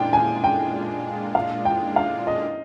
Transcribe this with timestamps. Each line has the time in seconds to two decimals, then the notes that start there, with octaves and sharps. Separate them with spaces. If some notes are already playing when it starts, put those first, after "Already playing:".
Already playing: A#2 G#3 D4 F4 G5
0.13 G#5
0.44 G5
1.35 F5
1.65 G5
1.96 F5
2.27 D#5